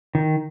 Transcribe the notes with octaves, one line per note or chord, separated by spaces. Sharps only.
D#3